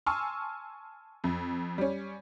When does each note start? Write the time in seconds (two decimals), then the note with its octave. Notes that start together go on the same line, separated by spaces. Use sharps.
0.07 G#5 A5 C6 C#6 E6 F6
1.24 F2
1.78 G3 C#4